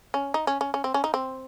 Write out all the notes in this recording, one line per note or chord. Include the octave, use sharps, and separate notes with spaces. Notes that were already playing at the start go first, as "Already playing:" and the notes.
C#4
D#4
C#4
C#4
C#4
C4
C#4
D#4
C4